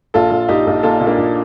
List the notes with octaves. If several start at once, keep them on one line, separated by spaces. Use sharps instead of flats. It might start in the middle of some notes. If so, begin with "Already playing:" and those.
A#1 F4 A4
A#1
A#1 D#4 G4
A#1
A#2 F4 A4
A#2
A#3 D4
A#1